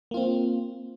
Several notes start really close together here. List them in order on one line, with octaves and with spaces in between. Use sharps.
A#3 F4 C4